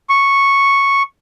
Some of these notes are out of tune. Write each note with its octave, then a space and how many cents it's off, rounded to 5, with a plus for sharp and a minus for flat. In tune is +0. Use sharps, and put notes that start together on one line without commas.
C#6 -5